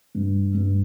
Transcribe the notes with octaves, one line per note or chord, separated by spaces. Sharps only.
G2
G2